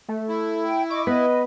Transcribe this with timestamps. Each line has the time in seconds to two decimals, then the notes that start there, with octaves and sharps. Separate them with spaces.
0.09 A3
0.29 E4
0.64 G5
0.90 D#5 C#6 D6
1.07 B3 B4 D#5